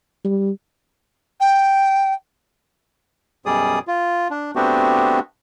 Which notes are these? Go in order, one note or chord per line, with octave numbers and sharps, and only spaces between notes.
G3
G5
F#2 B2 G3 G#4 D5 D#6
F4
D4
A3 B3 C4 D4 F#4 G4